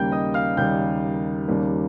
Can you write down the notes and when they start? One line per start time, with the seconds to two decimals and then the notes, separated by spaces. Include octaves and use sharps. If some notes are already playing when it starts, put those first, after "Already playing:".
Already playing: D#2 C#3 G3 A#3 G5 G6
0.12 D#5 D#6
0.34 F5 F6
0.57 D#2 C#3 G3 A#3 G5 G6
1.48 D#2 C#3 G3 A#3